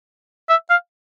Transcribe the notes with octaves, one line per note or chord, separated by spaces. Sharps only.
E5
F5